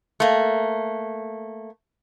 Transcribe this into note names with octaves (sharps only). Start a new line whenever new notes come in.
A3 A#3